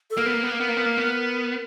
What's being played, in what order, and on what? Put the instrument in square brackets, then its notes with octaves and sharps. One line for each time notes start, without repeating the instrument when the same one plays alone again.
[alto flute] A4
[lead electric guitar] A#3 [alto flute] A#4
[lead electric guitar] B3
A#3
B3
A#3
B3
A#3
B3
A#3
B3